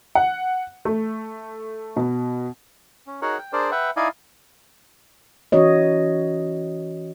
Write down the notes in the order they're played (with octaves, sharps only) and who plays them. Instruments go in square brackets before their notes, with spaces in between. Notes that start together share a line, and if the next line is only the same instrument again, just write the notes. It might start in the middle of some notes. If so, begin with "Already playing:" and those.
[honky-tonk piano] F#5
A3
B2
[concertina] C#4
D#4 F#4 G#4 A#4 C#5 F#5
G5
D4 G#4 A#4 C5 D5
B4 E5 F#5 G5
D#4 E4 D5 D#5 F5 G#5
[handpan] E3 C#4 F#4 C#5 D#5